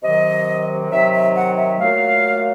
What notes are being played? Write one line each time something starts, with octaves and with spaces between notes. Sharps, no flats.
C3 D#3 F#3 D#5
C3 D#3 F#3 E5
E5
F#5
E5
A#2 F#3 A3 F5